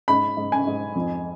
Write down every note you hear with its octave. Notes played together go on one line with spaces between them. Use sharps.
G#2 B5
G#2
G#5
G#2
F2